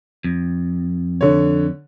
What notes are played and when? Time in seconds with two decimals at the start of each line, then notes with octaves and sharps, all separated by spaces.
0.24 F2
1.21 D3 C#5